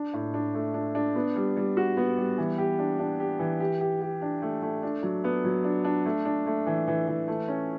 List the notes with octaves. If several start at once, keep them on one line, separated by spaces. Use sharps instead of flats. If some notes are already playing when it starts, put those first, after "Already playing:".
Already playing: D4
A2
D4
A3
D4
D4
B3
G3
G3
F#4
B3
G3
E3
G4
D4
D4
G4
E3
G4
G4
G4
D4
A3
A3
D4
F#3
B3
F#3
D4
D4
A3
D4
A3
E3
E3
E3
A3
C#4